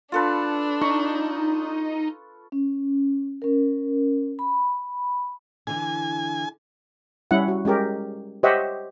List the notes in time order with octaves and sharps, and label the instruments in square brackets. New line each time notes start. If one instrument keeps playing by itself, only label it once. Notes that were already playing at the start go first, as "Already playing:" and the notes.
[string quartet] D4 [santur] F4 A4 B4
[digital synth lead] D#4 [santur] C#6
[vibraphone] C#4
C#4 A#4
B5
[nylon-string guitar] D3 E3 [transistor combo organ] G#5
[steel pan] G3 C#4 E4 F#5
F#4
G#3 C#4 G4 A#4
G4 C5 C#5 D#5 E5 F#5